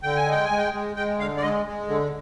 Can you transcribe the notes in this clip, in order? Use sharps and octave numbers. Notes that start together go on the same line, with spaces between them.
D3 G5
G#5
G#3 G5
G#5
G#3
G5
G#3
G#3 G5
D3 F5
D5
G#3 D#5
G#3
D3